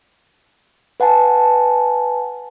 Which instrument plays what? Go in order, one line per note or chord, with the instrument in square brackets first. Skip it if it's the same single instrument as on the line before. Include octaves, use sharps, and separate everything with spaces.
[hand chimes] B4 F#5 G#5 A5